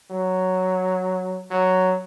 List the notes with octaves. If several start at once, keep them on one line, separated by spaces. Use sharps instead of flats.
F#3
F#3